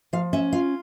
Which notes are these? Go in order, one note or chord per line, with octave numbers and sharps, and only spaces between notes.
F3 F5
C#4 E5
F4 F5